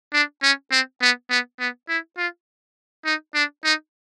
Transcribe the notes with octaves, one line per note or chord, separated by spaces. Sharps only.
D4
C#4
C4
B3
B3
B3
E4
F4
D#4
D4
D#4